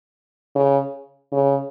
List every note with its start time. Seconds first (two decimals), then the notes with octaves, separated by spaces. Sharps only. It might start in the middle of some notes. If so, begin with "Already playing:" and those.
0.56 C#3
1.32 C#3